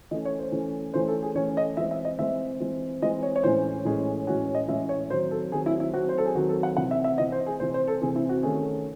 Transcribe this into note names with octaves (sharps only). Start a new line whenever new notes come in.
E3 A3 C#4 D#5
C#5
C5
E3 A3 C#4
E3 A3 C#4 C5
A4
G#4
E3 A3 C#4 C#5
D#5
E3 G#3 C4 E5
E5
D#5
E3 G#3 C4 E5
E3 G#3 C4
E3 G#3 C4 D#5
C#5
C#5
A2 E3 G#3 C#4 C5
A2 E3 G#3 C#4 G#4
A2 E3 G#3 C#4 F#4
D#5
A2 E3 G#3 C#4 E5
C#5
D#3 F#3 C4 C5
A4
D#3 F#3 C4 G#4
E4
E4
D#3 F#3 C4 F#4
C5
A4
G#4
D#3 F#3 C4 F#4
A4
F#5
C3 E3 C4 F#5
E5
E5
C3 E3 C4 D#5
C5
G#4
C3 E3 C4 C5
C5
A4
C3 E3 C4 G#4
E4
F#4
D#3 A3 C#4 G#4